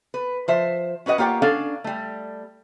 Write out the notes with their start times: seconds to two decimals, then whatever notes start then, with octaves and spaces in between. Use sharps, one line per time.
0.14 B4
0.48 F3 C5 E5
1.06 C#4 F#4 B4 D#5 F#5
1.18 A#3 F4 G4 C#5 F#5
1.42 C#4 D4 A4 F5
1.84 G3 A3